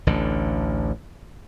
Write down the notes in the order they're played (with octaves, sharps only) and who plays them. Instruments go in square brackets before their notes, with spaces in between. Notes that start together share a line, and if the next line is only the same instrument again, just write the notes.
[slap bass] A1 D2 D3